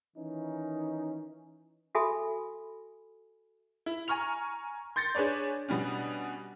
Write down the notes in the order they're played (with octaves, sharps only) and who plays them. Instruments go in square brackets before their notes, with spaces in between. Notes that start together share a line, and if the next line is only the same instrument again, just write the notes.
[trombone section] D#3 E3 C#4 D#4
[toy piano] F#4 A4 E5 G#5 B5 D#6
[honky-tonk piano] E4
G#5 A#5 C#6 F6 F7
C6 G6 A6 A#6 C#7
D4 G#4 B4 C#5 D5
B2 G3 C#4 D4